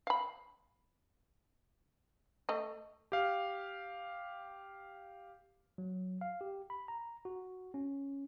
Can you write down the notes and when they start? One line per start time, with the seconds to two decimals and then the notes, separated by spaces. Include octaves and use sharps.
0.07 F5 B5
2.49 A3 D#5
3.12 G4 F5
5.78 F#3
6.21 F5
6.41 G4
6.70 B5
6.88 A#5
7.25 F#4
7.74 C#4